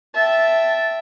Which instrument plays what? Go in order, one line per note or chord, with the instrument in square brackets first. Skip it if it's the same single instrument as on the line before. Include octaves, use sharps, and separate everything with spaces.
[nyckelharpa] E5 G5 [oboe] A5